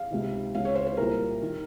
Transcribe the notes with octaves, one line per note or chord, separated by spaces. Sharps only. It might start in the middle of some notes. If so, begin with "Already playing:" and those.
Already playing: F5
C#2 C3 D#3
C#2 C#3 F5
C#5
C5
C5
C2 A#2 A#4
D#3